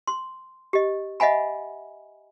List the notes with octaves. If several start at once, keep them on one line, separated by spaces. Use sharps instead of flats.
C6
G4 D#5
D#5 E5 F#5 G#5 B5